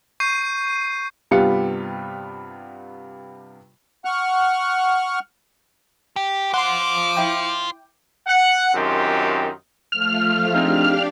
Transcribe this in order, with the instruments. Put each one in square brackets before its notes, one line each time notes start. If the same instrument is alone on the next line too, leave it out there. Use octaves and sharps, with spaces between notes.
[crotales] C#6 G6 C7 D#7
[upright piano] G2 C3 G3 B3 F4 C#7
[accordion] F#5 C#6 F6 F#6
[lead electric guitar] G4
[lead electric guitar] F4 C5 [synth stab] F#5 C6 [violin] D6
[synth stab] E4 G5
[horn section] F#5
F#2 D#3 C4 D#4 F4 G4
[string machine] F3 A3 F4 [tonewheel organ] F6
[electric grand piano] C4 D#4 G#4 [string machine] D4 G4 F5